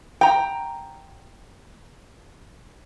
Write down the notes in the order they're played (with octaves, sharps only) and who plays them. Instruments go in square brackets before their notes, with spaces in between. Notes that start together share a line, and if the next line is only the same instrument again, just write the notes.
[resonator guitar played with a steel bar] G5 A#5